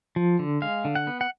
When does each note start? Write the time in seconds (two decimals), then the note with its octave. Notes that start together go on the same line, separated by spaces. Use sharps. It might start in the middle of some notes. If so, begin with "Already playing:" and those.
0.16 F3
0.39 D3
0.62 G#3 F5
0.85 D3
0.95 F#5
1.07 B3
1.21 F#5